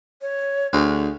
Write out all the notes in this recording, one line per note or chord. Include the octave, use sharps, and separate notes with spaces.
C#5
D2 G#4